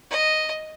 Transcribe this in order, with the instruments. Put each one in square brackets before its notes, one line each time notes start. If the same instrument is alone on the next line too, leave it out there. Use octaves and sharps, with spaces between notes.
[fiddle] D#5